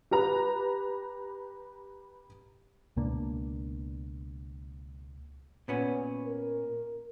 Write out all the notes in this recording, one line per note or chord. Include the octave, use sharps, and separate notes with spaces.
G4 B4 A#5
C#2 B2 A#3 D4
A#2 B3 C#4
A#4